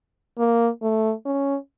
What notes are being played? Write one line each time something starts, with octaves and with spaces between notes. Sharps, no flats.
A#3
A3
C#4